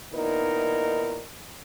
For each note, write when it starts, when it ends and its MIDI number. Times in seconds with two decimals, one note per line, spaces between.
0.13 1.22 46
0.13 1.22 51
0.13 1.22 59
0.13 1.22 63
0.13 1.22 64
0.13 1.22 70